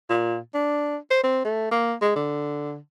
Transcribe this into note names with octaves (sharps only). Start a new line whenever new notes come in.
A#2
D4
C5
C4
A3
A#3
G#3
D3